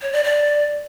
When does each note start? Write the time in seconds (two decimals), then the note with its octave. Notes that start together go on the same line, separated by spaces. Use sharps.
0.02 C#5
0.13 D5
0.24 D5